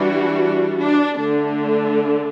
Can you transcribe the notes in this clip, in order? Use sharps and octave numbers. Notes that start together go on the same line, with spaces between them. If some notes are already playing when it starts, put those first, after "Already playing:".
Already playing: E3 G3 D4 F#4
D4
D3 A3 D4